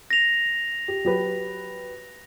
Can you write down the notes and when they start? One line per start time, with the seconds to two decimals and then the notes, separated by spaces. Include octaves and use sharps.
0.10 A#6 F7
0.88 G4
1.05 F#3 G4 B4